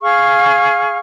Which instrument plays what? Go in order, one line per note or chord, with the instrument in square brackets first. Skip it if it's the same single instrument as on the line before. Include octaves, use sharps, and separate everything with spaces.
[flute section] G#4 F5 C#6 F6